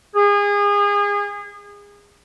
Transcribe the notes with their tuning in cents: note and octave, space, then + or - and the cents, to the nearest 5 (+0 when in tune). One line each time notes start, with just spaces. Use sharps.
G#4 -30